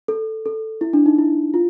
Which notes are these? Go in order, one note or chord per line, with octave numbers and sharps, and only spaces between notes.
A4
A4
E4
D4
D#4
E4
F4